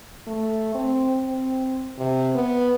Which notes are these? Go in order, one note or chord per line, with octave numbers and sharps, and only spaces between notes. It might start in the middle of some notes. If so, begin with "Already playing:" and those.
A3
C4
C4
C3
B3